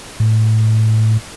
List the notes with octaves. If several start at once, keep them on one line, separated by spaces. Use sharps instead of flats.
A2